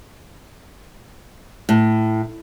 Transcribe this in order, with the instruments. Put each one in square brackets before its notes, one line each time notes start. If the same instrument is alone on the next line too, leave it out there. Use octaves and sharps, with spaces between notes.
[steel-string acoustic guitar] A2